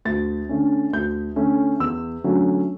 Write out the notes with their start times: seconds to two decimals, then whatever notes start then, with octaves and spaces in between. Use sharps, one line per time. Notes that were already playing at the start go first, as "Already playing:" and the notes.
0.05 D2 A6
0.49 D3 A3 C#4
0.93 D2 G6
1.36 D3 A3 C#4
1.80 E2 E6
2.24 D3 F#3 A3 C#4